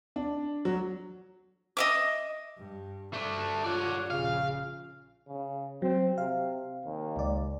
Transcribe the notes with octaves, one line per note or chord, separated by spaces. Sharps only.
D4
F#3
D#5 E5 D6
G2
G2 A3 D4
F4 C#5 D5 F#5
A#1 C#3 F4 F5
C#3
F#3 C4
C3 F5
D#2
C#2 D5